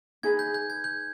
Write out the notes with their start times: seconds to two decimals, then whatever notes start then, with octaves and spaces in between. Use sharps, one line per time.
0.23 D#4 G#4 B4 G#6
0.39 G6
0.54 G6
0.70 G#6
0.84 G6